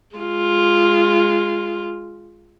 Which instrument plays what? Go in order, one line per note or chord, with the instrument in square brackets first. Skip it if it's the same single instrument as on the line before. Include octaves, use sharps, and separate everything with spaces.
[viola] G#3 F4